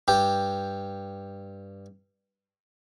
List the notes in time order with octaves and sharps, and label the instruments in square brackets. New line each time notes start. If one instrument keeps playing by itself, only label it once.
[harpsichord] G2 G4